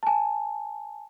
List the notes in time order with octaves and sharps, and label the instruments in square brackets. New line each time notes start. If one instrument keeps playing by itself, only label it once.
[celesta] G#5 A5